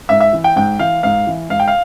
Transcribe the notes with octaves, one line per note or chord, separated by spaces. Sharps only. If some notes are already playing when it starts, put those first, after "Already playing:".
G#2 E5
E5
E3
G5
G#2 G5
E3 F5
G#2 F5
E3
G#2 F5
G5
F5